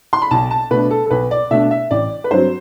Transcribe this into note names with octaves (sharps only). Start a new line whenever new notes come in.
C6
B5
B1 A5
A5
B2 A3 D4 B4
A4
A4
B1 B4
D5
B2 A3 D4 E5
E5
A1 D5
B4
G2 F#3 C4 C5